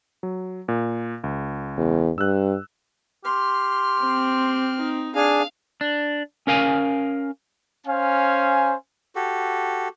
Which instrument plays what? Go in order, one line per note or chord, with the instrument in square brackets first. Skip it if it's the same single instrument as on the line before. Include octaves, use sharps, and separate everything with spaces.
[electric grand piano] F#3
A#2
C#2
[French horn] E2
[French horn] G2 [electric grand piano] E6 F#6
[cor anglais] G4 [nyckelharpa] C6 [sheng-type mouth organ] F6
[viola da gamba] C4
[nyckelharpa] D#4
[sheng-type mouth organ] D4 G#4 G#5 [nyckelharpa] F5
[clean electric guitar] D4
C#4 A#4 F5 G#5
[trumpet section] C#4 C5 F5 G#5
[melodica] F#4 G4 A4